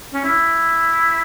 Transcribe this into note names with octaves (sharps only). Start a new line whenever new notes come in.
C#4
E4